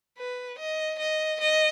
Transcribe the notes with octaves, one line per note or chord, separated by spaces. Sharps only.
B4
D#5
D#5
D#5